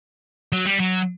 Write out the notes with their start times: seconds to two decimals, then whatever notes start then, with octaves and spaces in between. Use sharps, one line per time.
0.52 F#3
0.65 G3
0.79 F#3